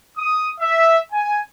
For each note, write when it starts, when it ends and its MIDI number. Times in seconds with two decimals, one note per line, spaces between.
0.17 0.48 87
0.60 0.97 76
1.12 1.39 80